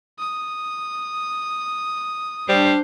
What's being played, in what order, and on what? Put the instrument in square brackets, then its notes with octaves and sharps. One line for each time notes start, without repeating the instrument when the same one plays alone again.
[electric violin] D#6
[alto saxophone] G3 [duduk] D4 [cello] C5